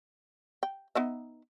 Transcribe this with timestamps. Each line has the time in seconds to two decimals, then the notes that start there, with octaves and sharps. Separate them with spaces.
0.63 G5
0.95 B3 D#4 E5